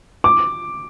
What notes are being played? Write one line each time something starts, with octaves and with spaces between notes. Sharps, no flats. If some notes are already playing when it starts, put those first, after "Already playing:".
D6